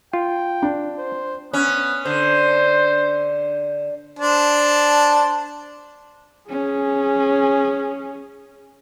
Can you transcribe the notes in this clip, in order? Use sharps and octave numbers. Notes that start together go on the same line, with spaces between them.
F4 G5
D4
C5
B3 C#4
D3 C5
D4 C5 A5
C#4 G#4